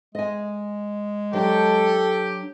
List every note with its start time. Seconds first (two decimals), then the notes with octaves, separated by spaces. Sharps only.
0.15 G#3 D#5 G#5
1.33 F#3 D4 G4 A4